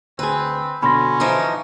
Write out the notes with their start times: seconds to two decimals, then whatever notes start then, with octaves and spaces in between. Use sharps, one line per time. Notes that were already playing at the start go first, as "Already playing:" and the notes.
0.19 D2 C4 G#4 B4
0.83 B2 D3 C#4 B5 C6 A#6
1.20 E3 F3 D#4